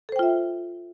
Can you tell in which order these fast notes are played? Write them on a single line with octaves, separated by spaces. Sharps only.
A4 C5 G5 F4 E5